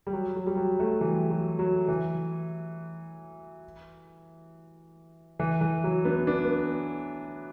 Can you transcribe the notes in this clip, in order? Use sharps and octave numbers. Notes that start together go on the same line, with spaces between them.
G3
F#3
F#3
G3
F#3
F#3 A3
E3 G3
F#3
F#3
E3
E3
E3
F#3
B3 D4
B3 D4
B3